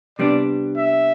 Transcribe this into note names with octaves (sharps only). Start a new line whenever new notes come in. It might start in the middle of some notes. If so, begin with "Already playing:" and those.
C3 G3 B3 D4 D5
E5